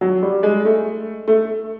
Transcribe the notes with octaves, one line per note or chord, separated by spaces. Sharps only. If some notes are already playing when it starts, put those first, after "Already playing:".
F#3
G3
G#3
A3
A3